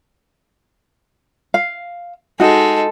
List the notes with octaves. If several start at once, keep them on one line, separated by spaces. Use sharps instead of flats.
F5
G#3 D#4 F#4 A4